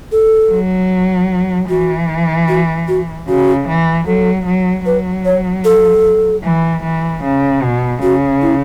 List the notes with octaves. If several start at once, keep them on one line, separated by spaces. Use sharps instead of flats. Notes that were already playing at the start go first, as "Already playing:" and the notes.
A4
F#3
E3 F#4
F#4
F#4
C#3 F#4
E3
F#3 A4
F#3
F#3 B4
C#5
A4
E3
E3
C#3
B2
C#3 F#4
E4